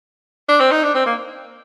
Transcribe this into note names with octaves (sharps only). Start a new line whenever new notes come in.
D4
C4
D#4
D4
C4
A#3